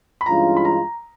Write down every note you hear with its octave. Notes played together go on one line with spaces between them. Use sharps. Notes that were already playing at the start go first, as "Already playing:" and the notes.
B5
G2 E3 G#3 C#4 F4 A#5
B5
A#5